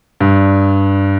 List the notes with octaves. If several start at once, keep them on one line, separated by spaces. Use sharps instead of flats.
G2